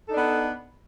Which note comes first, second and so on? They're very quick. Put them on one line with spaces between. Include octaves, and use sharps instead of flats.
A4 D#4 D4 B3